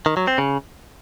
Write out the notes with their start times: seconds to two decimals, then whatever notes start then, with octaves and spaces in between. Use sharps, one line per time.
0.06 D#3
0.17 F#3
0.27 C4
0.38 C#3